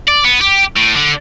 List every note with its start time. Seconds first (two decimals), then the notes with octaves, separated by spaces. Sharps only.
0.08 D5
0.25 B3
0.41 G4
0.76 A2
0.95 D3